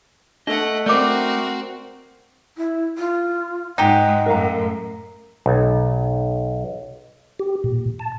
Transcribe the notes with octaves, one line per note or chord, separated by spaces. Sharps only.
A3 D4 D#5 F#5
A3 C4 F#4 A#4 D5 D6
E4
F4
G#2 G#3 D#4 G4 F#5
F#2 A2 A#4 F5 A#5
B1
G4
A#2
A5